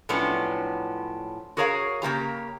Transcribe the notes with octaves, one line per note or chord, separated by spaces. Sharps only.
A2 F3 F#3 B3 C#4 D4
F#4 G#4 A#4 C#5 E5 F5
C#3 A#3 G4 A#5